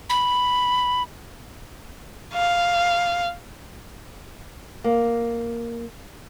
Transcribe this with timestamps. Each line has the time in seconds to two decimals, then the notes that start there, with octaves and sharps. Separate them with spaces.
0.10 B5
2.34 F5
4.84 A#3